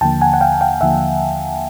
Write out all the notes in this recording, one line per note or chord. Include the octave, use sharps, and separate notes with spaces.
D#2 D3 F3 A#3 G5 A5
F#5 G#5
F#5
F5 G5
F5 G5
D#2 D3 F3 A#3 E5 F#5